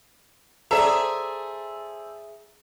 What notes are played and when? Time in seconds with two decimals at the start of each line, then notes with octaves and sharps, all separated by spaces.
0.71 G#4 A4 C5 D5 E5 A#5